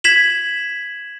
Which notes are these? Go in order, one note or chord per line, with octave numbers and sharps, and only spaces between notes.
G#6 B6 E7 F#7